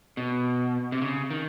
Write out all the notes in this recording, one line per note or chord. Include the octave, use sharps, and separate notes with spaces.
B2
C3
C#3
D#3